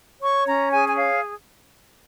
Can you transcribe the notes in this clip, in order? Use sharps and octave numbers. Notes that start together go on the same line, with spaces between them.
C#5 C#6
C#4 A#5
G#4 G#5
G#5
C#5 F5